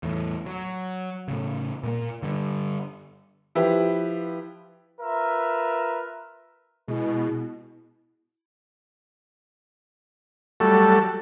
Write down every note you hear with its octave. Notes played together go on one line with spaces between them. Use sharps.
E2 A2
F#3
A2 C#3
A#2 A3 A#3
G2 D3
F3 E4 G4 B4
F4 A#4 B4 E5
B2 G#3 E4
F#3 G3 A3 A4